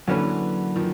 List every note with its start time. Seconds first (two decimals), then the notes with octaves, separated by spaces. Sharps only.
0.07 D3 E3 F#3 A#3 C#4 F#4 B4
0.76 D#3 F3